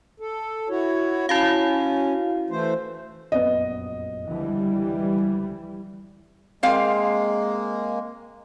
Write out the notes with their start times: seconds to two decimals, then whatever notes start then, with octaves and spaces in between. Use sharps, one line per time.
0.20 A4
0.69 E4 F#4 C#5
1.29 C#4 E4 F#4 F5
2.50 E3 A3 C5
3.32 F1 A#1 F#2 B3 D#5
4.29 C#2 D3 E3 F3 G3
6.63 G#3 A#3 C4 F5